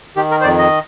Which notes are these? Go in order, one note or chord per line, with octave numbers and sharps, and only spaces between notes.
D#3 G4
A#4
C5
F2 D5
D#5